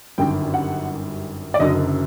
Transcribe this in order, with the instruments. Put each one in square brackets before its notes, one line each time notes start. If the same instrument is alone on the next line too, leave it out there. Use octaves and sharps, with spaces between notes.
[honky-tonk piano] G1 F#2 D#3 G3 G5
F#5
D5
F#1 F#2 D3 F#3 D#5